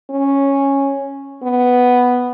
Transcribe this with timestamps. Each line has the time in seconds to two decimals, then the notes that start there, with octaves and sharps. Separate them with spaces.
0.10 C#4
1.43 B3